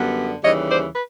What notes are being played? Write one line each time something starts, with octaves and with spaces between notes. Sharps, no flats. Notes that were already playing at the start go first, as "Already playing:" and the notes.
Already playing: F#2 D3 G3 B3
D#2 C#3 E3 G3 C#5 D#5
C5 D5
B4